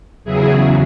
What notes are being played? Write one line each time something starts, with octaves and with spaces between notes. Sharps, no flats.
E2 C#3 F#3 E4 G#4